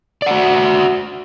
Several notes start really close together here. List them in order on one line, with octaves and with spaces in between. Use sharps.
D5 F#5 F#4 E5